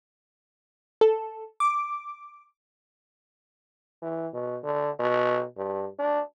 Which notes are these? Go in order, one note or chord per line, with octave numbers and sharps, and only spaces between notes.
A4
D6
E3
B2
D3
B2
G2
D4